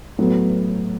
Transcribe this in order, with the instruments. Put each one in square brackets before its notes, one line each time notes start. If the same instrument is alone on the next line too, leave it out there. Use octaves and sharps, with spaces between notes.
[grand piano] A2 F#3 B3